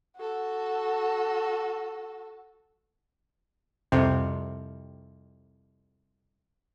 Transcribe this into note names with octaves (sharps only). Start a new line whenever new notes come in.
F#4 A4
C2 F2 C3